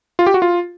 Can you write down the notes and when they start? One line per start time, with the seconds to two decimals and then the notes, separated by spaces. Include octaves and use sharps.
0.19 F4
0.27 G4
0.34 F#4
0.42 F4